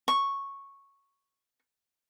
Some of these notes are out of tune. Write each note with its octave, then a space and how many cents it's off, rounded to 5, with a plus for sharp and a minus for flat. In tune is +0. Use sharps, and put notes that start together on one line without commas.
C#6 -5